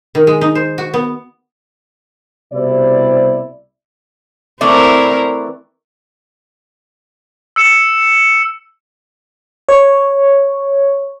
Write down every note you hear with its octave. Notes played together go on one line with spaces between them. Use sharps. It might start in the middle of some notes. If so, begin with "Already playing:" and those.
D#3
G#3
D#4
C5
F#4
B3
C2 B2 G3 E4 C5 D5
E3 A3 C4 E4 A#4 D5
E6 C#7 E7
C#5